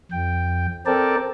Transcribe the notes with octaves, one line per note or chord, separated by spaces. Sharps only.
F2 G5
C4 A4 A#4 D5 G5 A5